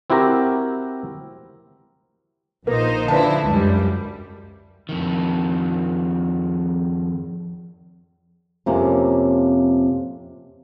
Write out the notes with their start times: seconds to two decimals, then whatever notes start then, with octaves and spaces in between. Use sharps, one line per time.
0.10 C4 E4 F#4 G4 A#4
2.67 A#1 A#3 D#4 C5
3.08 D3 F3 D4 E4 B4 A5
3.43 C#2 F#2 G3
4.89 F2 D#3
8.66 F2 C3 A#3 C#4